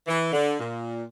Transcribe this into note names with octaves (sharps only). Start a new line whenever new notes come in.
E3
D3
A#2